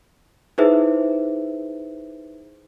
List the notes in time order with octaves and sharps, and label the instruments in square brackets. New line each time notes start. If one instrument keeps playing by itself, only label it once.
[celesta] D#4 E4 G#4 B4 C5 E5